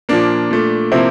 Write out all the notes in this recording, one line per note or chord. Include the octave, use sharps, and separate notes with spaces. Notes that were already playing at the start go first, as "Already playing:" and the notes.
A#2 F3 A#3 D4
A#2 A3
C3 F3 A#3 C4 E4